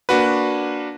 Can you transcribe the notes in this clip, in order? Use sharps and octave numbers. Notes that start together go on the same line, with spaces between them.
A#3 D4 F#4 B4